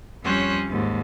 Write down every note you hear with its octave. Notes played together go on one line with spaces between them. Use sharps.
F2 G3 C#4 C5 C#5 F#6
D#2 G#2